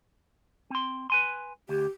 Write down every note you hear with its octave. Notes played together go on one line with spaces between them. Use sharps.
C4 C6
B4 G#5 C6
D2 G4